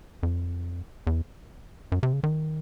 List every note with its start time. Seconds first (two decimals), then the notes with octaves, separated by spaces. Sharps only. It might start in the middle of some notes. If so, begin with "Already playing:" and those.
0.23 F2
1.07 E2
1.92 F#2
2.03 C3
2.13 C#3
2.24 D#3